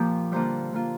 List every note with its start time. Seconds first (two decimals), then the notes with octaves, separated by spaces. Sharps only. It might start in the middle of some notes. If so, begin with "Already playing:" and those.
Already playing: A#2 F3 A#3 G4
0.31 D3 G3 A#3 F4 C5
0.73 D3 A#3 F4